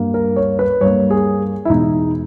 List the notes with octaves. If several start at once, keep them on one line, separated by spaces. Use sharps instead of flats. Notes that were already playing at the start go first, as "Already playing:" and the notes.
Already playing: G2 G3 A#3
A#4
C#5
B4
G2 G3 A#3 C#5
G#4
E4
E2 B2 G#3 D#4